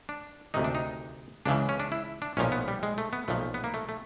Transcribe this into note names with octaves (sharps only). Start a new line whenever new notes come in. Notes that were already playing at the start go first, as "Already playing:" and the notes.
D4
D2 C3 D#3 D#4
D4
D#4
C#2 C#3 E3 D4
C#4
D4
E4
D4
B1 A#2 F3 C#4
B3
G3
G#3
A3
B3
B1 A#2 F3 A3
B3
A#3
A3
A3